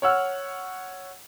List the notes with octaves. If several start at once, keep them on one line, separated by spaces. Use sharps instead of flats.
C#5 F#5 E6 F6